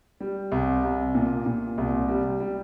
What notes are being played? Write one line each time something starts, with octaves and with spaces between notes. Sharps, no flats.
G3
C2
C2
A#2
A#2
C2
G3
G3